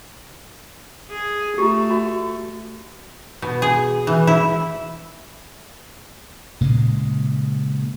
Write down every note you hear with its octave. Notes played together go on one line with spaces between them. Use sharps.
G#4
A3 F4 G4
F#4
B2
G#4
E3
E4
A#2 C#3 G#3